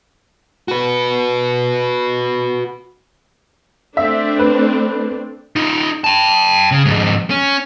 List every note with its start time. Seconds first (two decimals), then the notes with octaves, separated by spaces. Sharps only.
0.68 F#4 B4
3.97 A3 C4 D4 E5
4.39 B4
5.56 D#4 F4
6.04 G5 A5
6.72 C#3
6.85 F2 G#2
7.30 C#4